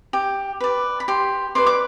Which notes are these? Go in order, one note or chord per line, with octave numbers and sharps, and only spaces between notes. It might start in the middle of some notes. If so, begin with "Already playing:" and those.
G4
B4 D5
B5
G4 C6
B4 D5 C6
D6